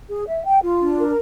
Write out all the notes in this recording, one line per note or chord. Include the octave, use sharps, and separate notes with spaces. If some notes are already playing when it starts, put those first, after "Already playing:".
G#4
E5
G5
F4
D4
A#4